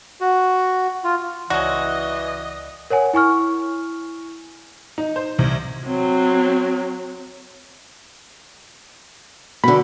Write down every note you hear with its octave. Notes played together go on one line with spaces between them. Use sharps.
F#4
F4
C#2 E3 C#4 F#4 D5 D#5 F#6
A#4 C#5 F#5 G#5
E4 G#5 C#6 F6
D#4
C5
C2
F#3 C4
B2 D3 B5